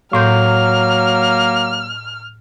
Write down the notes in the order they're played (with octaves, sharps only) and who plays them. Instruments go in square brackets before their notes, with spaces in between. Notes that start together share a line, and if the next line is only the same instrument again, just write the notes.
[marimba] A2 C6 G6 [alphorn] F#3 [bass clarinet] A#3 [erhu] F6